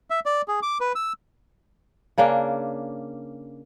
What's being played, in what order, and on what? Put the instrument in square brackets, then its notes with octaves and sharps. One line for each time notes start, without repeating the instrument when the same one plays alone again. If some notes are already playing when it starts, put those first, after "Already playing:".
[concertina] E5
D5
G#4
D6
B4
E6
[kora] C#3 A#3 C#4 D4